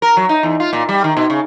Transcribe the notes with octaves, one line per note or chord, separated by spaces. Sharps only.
A#4
F#3
D#4
E2
F4
A#2
G3
D#3
B2
C#3